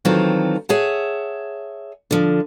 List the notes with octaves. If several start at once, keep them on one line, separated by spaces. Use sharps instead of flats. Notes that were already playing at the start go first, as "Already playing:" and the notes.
D#3 E3 F#3 C4 F4 A4
G#4 C#5 E5 F#5 A5
D3 F3